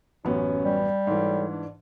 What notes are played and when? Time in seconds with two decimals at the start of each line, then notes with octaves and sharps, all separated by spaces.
0.25 A1 F#2 B3 C#4
0.64 G3
1.07 D2 G#2 E3 A3 C#5
1.48 D4